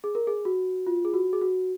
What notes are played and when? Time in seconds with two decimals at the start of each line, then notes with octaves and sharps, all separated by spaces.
0.04 G#4
0.15 A#4
0.27 G#4
0.45 F#4
0.87 F4
1.05 G#4
1.14 F#4
1.33 G#4
1.41 F#4